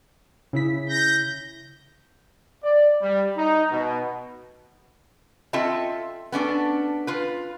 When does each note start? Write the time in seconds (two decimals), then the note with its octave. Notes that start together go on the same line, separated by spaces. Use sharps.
0.53 C#3 E4 B6
0.89 G6 A#6
2.64 D5
3.01 G3
3.36 D#4
3.71 B2
5.53 C4 F4 A4 D#5 E5 A5
6.32 B3 C#4 D4 A4
7.07 F4 B4